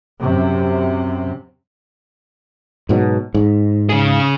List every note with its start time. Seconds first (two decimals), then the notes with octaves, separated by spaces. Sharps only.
0.19 F#2 C3
2.89 G#2 B2 F#3
3.34 G#2
3.89 C#3 G#4